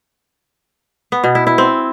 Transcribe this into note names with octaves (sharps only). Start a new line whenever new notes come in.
B3
B2
E4
E4
C4